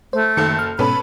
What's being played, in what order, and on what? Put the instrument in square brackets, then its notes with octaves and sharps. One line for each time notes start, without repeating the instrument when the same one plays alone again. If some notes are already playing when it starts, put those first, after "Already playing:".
[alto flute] A3 [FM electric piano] C5
[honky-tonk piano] F#1 A4 C#7 [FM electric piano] D#3
[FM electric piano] F6
[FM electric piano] G#2 B2 [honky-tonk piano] C#4 A4 B4 [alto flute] B5